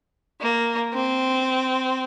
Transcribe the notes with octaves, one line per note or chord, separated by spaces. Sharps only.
A#3
C4